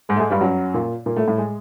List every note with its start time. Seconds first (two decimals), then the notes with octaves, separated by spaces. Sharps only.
0.09 G#2 G#3
0.16 A3
0.20 G#2 G#3
0.30 G2 G3
0.41 F#2 F#3
0.74 A#2 A#3
1.06 A#2 A#3
1.16 A2 A3
1.27 A2 A3
1.38 G#3